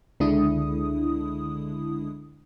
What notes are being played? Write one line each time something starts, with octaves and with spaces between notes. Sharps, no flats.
C#2 D3 G#3 D4 E4 D#6